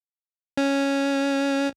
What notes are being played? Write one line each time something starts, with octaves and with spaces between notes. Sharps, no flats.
C#4